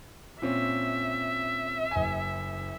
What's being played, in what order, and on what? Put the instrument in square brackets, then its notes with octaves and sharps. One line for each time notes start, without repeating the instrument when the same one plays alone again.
[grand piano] A#2 C4 C#4 [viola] E5
[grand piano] F#1 G#5